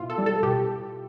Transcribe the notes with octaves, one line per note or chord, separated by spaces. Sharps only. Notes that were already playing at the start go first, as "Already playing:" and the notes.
Already playing: B2 E4 F4
A4
G3
A4
B2 G4